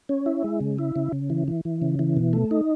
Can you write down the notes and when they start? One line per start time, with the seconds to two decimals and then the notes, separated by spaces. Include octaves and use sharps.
0.09 C#4
0.26 E4
0.44 G#3
0.60 C#3
0.78 E4
0.96 C#3
1.13 C#3
1.30 E3
1.48 E3
1.65 E3
1.82 C#3
1.99 E3
2.17 B2
2.33 A3
2.51 D#4